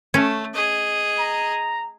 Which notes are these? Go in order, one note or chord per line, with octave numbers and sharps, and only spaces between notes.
A3 C#4
G#4 D#5
A#5